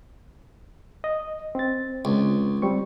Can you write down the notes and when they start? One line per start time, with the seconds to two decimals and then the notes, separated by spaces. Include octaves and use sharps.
1.04 D#5
1.55 C4 A6
2.05 C#2
2.62 G3 C4 C#6